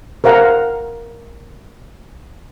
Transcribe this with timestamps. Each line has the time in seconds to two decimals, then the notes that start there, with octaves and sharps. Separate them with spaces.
0.24 A#4 C5 F5 F#5 A#5